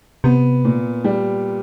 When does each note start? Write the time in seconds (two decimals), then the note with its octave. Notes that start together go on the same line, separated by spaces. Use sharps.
0.24 C3 B3
0.65 A#2
1.04 G3